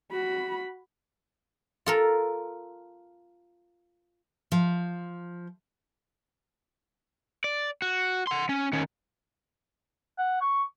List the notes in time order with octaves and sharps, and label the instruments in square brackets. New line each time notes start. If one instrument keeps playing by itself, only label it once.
[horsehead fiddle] F#4 B5
[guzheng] F4 A4 A#4
[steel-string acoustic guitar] F3
[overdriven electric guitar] D5
F#4
F#5 C6
C#4
D#3 C#4
[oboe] F#5
C#6